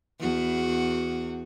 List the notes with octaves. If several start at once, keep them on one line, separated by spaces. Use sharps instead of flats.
E2 F#4